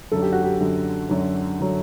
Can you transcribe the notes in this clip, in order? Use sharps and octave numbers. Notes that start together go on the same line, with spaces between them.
F#2 D3 F#3 A4
G4
F#4
G4
F#2 D3 F#3
F#2 D3 F#3
D3 F#3